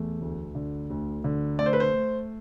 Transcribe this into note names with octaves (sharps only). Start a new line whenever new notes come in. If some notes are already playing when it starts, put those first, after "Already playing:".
Already playing: E2 A3
D2
D3
D2
D3
A3 D5
C5
B4
C5
A3